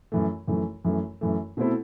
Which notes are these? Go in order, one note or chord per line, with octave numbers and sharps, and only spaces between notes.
F#2 E3 A3
F#2 E3 A3
F#2 E3 A3
F#2 E3 A3
B2 A3 C4 E4 A4